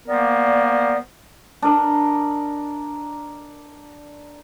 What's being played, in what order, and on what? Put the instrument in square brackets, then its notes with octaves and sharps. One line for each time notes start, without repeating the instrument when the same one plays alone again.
[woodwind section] G3 A#3 B3 A#4 C5 D5
[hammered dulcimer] D4 A#4 D#5